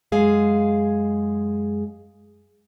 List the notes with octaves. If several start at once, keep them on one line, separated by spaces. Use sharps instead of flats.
F#2 G#3 G#4 F5